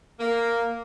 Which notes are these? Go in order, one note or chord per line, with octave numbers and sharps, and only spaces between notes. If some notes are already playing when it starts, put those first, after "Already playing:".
A#3